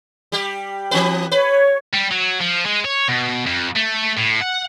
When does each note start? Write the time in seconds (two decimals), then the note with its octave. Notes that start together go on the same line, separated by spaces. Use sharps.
0.32 G3 G4
0.91 E3 C4 B4
1.32 B4 C#5
1.94 G3
2.12 F#3
2.40 F3
2.66 G#3
2.85 C#5
3.08 B2
3.47 F2
3.76 A3
4.18 A2
4.42 F#5